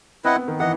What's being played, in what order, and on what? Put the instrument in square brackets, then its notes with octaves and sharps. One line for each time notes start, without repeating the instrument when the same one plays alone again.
[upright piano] C4 [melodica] E4 B4 D#5 F#5
[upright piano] B3
D#3
[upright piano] E3 [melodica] D#5 F#5